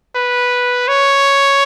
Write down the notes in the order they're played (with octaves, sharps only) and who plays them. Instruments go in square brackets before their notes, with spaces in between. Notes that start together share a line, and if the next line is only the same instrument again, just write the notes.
[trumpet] B4
C#5